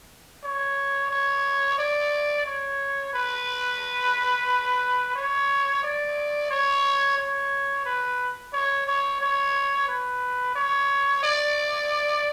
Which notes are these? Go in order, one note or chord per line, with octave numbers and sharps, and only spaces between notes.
C#5
C#5
D5
C#5
B4
C#5
D5
C#5
C#5
B4
C#5
C#5
C#5
B4
C#5
D5